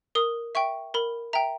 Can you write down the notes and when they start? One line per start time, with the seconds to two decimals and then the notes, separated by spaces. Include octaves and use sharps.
0.15 A#4 D#6
0.55 E5 G5 C#6
0.94 A#4 B5
1.33 E5 G5 A#5